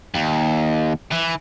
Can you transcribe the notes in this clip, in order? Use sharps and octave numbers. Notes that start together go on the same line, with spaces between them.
D#2
E3